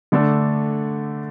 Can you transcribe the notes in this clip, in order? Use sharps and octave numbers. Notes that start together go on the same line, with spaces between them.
D3 A3 D4 A4